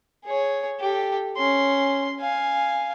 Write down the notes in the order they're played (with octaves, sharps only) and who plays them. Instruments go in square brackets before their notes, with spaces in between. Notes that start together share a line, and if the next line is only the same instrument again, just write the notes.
[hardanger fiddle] G#4 C#5
G4 A4
C#4 C6
F5 G#5